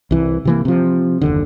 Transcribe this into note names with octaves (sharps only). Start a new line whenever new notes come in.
C2 E3
C3 E3 A#3
C3 F3
F#1 D#2 D3